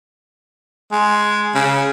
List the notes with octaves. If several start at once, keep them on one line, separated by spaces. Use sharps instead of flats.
G#3
C#3